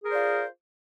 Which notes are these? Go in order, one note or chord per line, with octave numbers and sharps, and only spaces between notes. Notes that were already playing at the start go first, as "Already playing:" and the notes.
F4 G#4 A#4 C5 D5